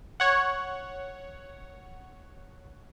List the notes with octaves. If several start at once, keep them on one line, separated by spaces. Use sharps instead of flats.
C#5 F#5